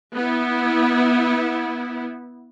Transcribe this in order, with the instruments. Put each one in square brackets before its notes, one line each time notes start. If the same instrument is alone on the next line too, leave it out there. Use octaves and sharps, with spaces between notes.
[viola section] B3 E4